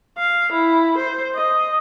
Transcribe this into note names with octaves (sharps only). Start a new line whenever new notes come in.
F5
E4
C5
D#5